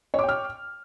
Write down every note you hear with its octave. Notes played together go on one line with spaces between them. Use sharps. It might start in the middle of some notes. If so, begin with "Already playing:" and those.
C#5 G5 D6 F6